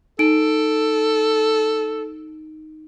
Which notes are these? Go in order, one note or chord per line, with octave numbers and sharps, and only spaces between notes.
D#4 A4 D7